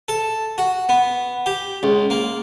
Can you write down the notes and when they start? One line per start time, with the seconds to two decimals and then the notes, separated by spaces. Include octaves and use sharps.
0.08 A4
0.58 F#4
0.89 B3
1.46 G4
1.83 C#2
2.10 A#3